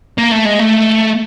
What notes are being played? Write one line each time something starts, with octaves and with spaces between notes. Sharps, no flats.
A#3
A3
G#3
A3